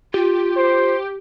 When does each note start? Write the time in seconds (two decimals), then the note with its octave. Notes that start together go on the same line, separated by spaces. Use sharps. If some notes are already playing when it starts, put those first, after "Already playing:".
0.14 F4 G4
0.57 C5